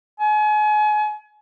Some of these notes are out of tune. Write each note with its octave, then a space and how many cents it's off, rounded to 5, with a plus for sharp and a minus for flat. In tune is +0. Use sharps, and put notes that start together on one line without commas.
G#5 +35